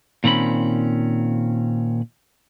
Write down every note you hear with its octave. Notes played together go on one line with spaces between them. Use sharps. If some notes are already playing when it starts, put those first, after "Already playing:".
A#2 D#3 C4 C#4 B5